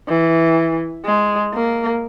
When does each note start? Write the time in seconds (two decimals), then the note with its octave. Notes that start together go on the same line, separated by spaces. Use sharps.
0.08 E3
1.05 G#3
1.54 A#3